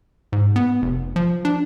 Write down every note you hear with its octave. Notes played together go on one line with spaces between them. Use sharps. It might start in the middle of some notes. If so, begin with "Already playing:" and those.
G#2
B3
F1
F3
D4